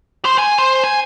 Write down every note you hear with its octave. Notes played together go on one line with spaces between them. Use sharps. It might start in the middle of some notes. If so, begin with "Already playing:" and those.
C5 C6
G#5
C5
G#5